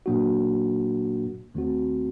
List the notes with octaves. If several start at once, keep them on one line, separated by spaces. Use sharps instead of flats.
A#2 F#3 A#3 D4 F#4
D#2 D#3 A3 C4 F#4